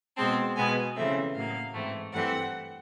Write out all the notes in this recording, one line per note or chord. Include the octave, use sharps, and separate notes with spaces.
B2 G#3 C4 A5
B2 G#3 B3 G#5
C#3 E3 A3 C4 E5
A2 F#3 A#3 F5
G#2 E3 A3 C4
G2 E3 A3 C4 F#5